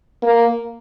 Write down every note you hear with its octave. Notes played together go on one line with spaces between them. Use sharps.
A#3